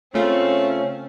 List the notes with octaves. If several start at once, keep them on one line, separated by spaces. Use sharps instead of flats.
C#3 A3 C4 C#4 F4